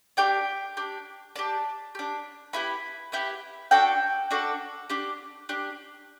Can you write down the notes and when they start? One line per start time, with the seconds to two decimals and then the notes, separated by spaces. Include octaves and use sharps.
0.17 D4 G4 G5
0.77 D4 G4
1.36 D4 G4 A5
1.95 D4 G4
2.53 B3 E4 G4 B5
3.12 B3 E4 G4
3.71 D4 F#4 A4 G5
4.31 D4 F#4 A4
4.90 D4 G4
5.49 D4 G4